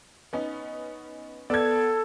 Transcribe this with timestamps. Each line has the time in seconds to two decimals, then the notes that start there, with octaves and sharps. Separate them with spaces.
0.33 B3 C#4 D#4
1.50 B3 A4 D5 E6 G#6